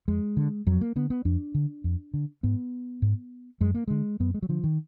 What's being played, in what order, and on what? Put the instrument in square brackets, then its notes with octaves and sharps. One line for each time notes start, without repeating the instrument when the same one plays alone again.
[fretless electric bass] F2 G#3
D3
F2 F#3
A#3
D3 B3
B3
F2 D4
D3
F2
D3
G#2 B3
G#2
F#2 G#3
A#3
D3 G#3
F#2 B3
G#3
F#3
D3 F3
D#3